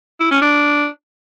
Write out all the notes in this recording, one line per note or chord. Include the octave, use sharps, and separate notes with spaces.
E4
C#4
D4